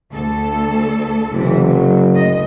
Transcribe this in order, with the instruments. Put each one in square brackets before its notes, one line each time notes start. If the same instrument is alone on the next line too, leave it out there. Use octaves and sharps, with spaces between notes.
[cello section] D2 A4
[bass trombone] F#1 [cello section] C3 E3
[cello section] F#3
D2 D#5